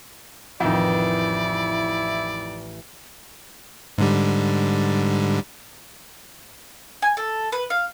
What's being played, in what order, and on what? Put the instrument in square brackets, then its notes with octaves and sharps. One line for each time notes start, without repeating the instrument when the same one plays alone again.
[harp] A1 E7 [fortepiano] F2 D#3 [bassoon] E4 [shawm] D5
[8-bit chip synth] G#2 D3 G3
[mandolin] G#5
A4
B4
F5